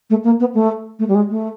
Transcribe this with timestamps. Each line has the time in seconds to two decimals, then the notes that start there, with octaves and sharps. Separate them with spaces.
0.10 A3
0.24 A#3
0.40 B3
0.54 A3
0.99 A3
1.08 G3
1.15 G#3
1.30 A3